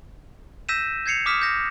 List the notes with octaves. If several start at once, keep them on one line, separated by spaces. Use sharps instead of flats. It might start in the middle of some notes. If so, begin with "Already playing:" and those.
E6 G6 A#6 B6 D#7 E7
G6 G#6 C7 C#7 F7
D6 D#6 F6 B6 E7
G6 A#6